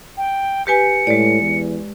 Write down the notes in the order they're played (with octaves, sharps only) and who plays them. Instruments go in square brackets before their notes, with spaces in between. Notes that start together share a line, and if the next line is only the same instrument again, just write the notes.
[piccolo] G5
[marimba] G4 B4 G#5 [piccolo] C#7
[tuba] A2 [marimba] G#3 D5
[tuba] E2